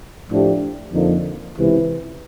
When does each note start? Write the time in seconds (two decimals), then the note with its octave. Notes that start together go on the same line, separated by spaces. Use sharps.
0.30 A2 F3 A3 D4 G4
0.93 F2 D3 F3 A#3 D#4
1.57 C#2 C3 E3